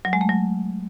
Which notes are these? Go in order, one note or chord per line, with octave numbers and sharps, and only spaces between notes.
F#3
G#3
A3
F#3